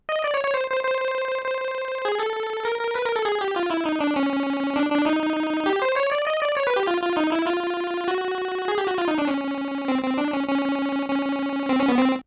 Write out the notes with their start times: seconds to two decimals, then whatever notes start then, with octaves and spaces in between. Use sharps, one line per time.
0.09 D#5
0.24 D5
0.34 C#5
0.44 C#5
0.54 C5
0.70 C5
0.84 C5
1.44 C5
2.05 G#4
2.19 A4
2.65 A#4
2.81 A#4
2.95 B4
3.05 A#4
3.16 A4
3.25 G#4
3.41 G4
3.56 F4
3.70 E4
3.85 D#4
4.01 D4
4.16 C#4
4.76 D4
4.92 D4
5.06 D#4
5.66 G4
5.82 C5
5.96 C#5
6.12 D5
6.27 D#5
6.42 D5
6.57 C#5
6.67 B4
6.76 G4
6.87 F4
7.03 F4
7.17 D#4
7.32 E4
7.47 F4
8.08 F#4
8.68 G#4
8.78 G4
8.88 F#4
8.98 F4
9.08 D#4
9.18 D4
9.27 C#4
9.88 C4
10.04 C4
10.18 D4
10.33 C#4
10.48 C#4
11.09 C#4
11.69 C4
11.79 C#4
11.88 B3
11.99 C4